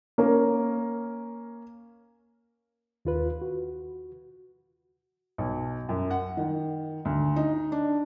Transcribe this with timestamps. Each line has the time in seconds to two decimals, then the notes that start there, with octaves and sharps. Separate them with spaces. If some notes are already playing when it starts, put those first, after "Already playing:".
0.18 A#3 C#4 A#4
3.05 D#2 F4 B4
3.42 F#4
5.38 B1
5.89 F#2
6.11 F#5
6.37 D#3
7.05 D2
7.36 D#4
7.72 D4